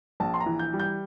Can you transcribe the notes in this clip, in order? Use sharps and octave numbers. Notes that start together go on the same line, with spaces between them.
A#1 A5
C6
A#5
E3
G6
G3
G6